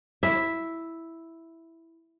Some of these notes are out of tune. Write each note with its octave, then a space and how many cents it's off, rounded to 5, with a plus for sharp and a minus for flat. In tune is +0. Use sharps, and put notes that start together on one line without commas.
E4 +0 E5 +0